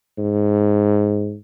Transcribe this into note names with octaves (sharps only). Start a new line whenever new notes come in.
G#2